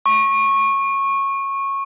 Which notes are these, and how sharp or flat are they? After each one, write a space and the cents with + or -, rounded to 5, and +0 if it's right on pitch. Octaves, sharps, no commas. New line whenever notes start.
C#6 -15